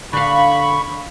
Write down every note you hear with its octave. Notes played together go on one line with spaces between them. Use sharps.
D3 F5 B5 C#6